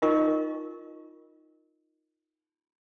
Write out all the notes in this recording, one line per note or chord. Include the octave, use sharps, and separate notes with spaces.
D#4 F4 A#4 D#5 C#6